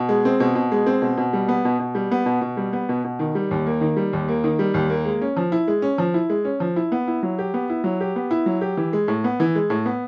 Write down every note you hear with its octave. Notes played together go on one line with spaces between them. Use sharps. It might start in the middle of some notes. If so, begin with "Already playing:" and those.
Already playing: B2
G#3
C4
B2
B2
G#3
C4
B2
B2
G3
B3
B2
B2
G3
B3
B2
B2
G3
B3
B2
B2
D#3
G3
D#2
A#3
D#3
G3
D#2
A#3
D#3
G3
D#2
A#3
G#3
C#4
F3
E4
G#3
C#4
F3
E4
G#3
C#4
F3
E4
B3
E4
F#3
G4
B3
E4
F#3
G4
B3
E4
F#3
G4
E3
G#3
A2
B3
E3
G#3
A2
B3